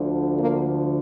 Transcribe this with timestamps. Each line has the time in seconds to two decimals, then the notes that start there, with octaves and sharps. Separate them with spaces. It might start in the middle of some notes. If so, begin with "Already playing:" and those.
Already playing: D2 D3 F3
0.40 A#3